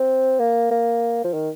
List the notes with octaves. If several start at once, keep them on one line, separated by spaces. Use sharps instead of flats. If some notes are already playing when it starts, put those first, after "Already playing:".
Already playing: C4
A#3
A#3
F3
D#3